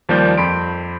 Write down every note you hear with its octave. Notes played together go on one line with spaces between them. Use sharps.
D#2 F3 G3 A#3 D5 G6
F2 B5 C6 D7